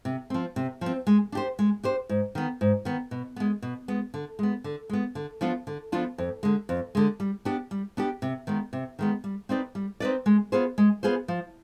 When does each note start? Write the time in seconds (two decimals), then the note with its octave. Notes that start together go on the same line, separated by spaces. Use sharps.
0.05 C3
0.30 F3 C4
0.56 C3
0.81 F3 C4
1.07 G#3
1.32 D4 G4 C5
1.59 G#3
1.83 D4 G4 C5
2.09 G#2
2.35 D#3 B3
2.61 G#2
2.85 D#3 B3
3.11 B2
3.36 G#3 B3
3.62 B2
3.88 G#3 B3
4.14 D3
4.39 G#3 B3
4.64 D3
4.89 G#3 B3
5.15 D3
5.41 F3 B3 D4 F4
5.67 D3
5.92 F3 B3 D4 F4
6.18 F2
6.43 D3 G#3
6.69 F2
6.95 D3 G#3
7.20 G3
7.45 B3 D4 G4
7.71 G3
7.97 B3 D4 G4
8.22 C3
8.47 D#3 G#3 B3
8.73 C3
8.99 D#3 G#3 B3
9.24 G3
9.49 C4 D#4 B4 D5
9.75 G3
10.00 C4 D#4 B4 D5
10.26 G#3
10.52 B3 F4 G#4 C5
10.78 G#3
11.03 B3 F4 G#4 C5
11.28 F3